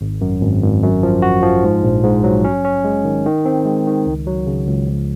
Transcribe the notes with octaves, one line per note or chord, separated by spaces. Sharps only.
G#1
F#2
G#1
G#1
F#2
F3
F#4
F3
G#2
A#1
G#2
F#3
C#4
C#4
G#3
D#3
D#3
C4
G#3
D#3
C#2
F#3
C#3
C#2
F3